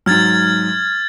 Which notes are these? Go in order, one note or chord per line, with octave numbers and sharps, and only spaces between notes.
G#2 F#3 F6 G#6 A6